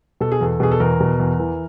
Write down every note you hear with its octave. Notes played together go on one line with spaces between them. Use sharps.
B2 A4
G#4
E2 A4
B2 G#4
A4
E2 A#4
B2
E2
E3